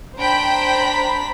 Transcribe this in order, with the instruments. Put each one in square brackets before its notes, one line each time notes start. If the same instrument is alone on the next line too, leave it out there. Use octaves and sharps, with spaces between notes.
[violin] D4 B6 [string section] C5 A#5 B5 [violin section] G5